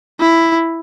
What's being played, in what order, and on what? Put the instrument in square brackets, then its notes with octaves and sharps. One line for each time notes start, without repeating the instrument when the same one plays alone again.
[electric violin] E4